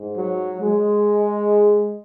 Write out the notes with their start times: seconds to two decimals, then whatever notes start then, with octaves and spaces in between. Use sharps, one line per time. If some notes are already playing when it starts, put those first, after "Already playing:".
Already playing: G#2
0.16 F#3
0.60 G#3